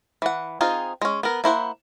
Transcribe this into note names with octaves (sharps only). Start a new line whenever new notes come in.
E3 F#5
C4 D#4 F4 G#4
G#3 C#4
B3 A#4
A#3 E4 C5 F#5